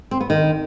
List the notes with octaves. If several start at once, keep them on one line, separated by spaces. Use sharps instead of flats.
C4
B3
D#3